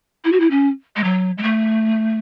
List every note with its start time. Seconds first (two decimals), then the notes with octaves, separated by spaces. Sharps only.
0.24 E4
0.32 F#4
0.40 E4
0.50 C#4
0.96 G#3
1.04 F#3
1.38 G#3
1.43 A3